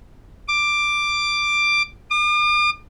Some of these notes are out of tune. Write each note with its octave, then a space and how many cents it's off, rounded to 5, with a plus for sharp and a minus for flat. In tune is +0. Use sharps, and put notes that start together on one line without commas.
D6 +10
D6 +45